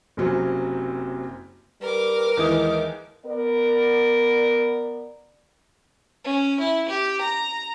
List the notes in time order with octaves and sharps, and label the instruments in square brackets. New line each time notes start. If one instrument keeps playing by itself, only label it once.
[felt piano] F#1 C3 F#3 C4 C#4
[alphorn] G3 [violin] A#4 D6 [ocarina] B4
[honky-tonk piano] D#2 E3 D#6 [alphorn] G#3
[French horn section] B3 A#4 D5
[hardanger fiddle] C#4
E4
G4
A#5